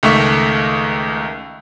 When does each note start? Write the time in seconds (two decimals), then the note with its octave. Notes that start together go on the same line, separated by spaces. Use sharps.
0.03 C#2 D#3 A3 E5 C#6